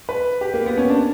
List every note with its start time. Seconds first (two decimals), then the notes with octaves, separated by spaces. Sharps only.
0.09 B4
0.41 G4
0.54 A#3
0.66 B3
0.77 C#4
0.89 D4